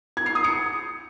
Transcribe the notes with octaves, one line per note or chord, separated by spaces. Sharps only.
G#6
C7
D#6
C#7